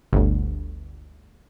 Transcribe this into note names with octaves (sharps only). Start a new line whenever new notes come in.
G1 D2